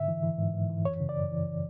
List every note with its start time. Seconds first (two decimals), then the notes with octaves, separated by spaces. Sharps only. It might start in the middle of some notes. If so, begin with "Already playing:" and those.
Already playing: G#2 D3 E5
0.08 E3
0.23 E3
0.39 G#2
0.54 G#2
0.70 E3
0.85 F#2 C#5
1.00 C#3
1.09 D5
1.17 F#2
1.31 E3